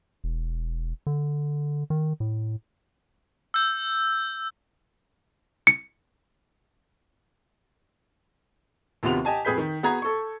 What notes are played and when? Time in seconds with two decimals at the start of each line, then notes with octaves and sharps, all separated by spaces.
0.24 E1
1.07 D3
1.90 D#3
2.20 A2
3.54 E6 G6
5.67 C#7
9.03 D#2 C3 B3 F4 F#4 F7
9.25 G4 D#5 G#5 A5
9.45 F2 G4 G#4 B4 G6 B6
9.58 D#3
9.83 B3 F#4 G#4 A#5 G#6
10.02 A4 C#6